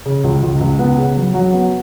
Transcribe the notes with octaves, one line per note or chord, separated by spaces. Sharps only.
C#3
C#2
C#2
C#2
B3
C#3
F#3
F#3
B3